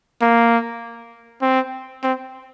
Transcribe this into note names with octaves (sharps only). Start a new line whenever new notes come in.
A#3
C4
C4